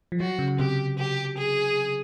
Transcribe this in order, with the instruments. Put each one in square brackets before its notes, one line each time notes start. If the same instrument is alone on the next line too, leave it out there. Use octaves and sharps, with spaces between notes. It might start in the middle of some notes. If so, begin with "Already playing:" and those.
[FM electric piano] F3
[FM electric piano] F#3 [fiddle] F#4
[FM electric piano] C#3
[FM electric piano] C3 [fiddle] G4
[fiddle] G4
G#4